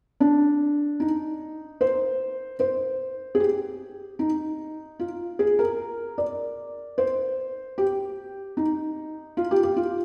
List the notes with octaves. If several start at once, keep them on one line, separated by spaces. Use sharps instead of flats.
D4
D#4
C5
C5
G#4
G4
D#4
F4
G#4
A#4
D5
C5
G4
D#4
F4
G4
G4
F4